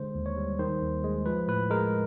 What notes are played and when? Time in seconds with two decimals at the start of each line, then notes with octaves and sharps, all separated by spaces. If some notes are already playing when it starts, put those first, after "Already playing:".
Already playing: D3 G#3 C5
0.15 D#2
0.26 C#5
0.37 G3
0.59 D#3 C5
0.82 D#2
1.04 G#3
1.26 F3 B4
1.48 A2 B4
1.70 G#3 A#4